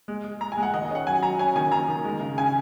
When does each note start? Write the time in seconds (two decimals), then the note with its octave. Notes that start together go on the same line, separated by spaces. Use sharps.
0.08 G#3
0.24 G#3
0.41 G#3 A#5
0.52 G#5
0.57 G#3
0.63 F#5
0.74 D#3 D#5
0.85 D#5
0.90 C#4 F#5
1.06 F#3 G#5
1.23 F#3 A#5
1.39 C#4 G#5
1.56 D#3 G#5
1.72 D#3 A#5
1.88 D#3
2.05 G#3
2.21 C#3
2.38 C#3 G#5